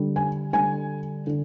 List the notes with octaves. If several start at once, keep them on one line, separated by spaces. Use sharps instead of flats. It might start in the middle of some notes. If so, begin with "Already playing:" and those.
Already playing: D3 G3
G#5
D3 G3 G#5
D3